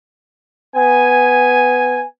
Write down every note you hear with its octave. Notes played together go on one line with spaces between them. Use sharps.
B3 G#5